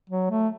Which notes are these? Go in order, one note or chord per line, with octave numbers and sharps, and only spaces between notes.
F#3
A3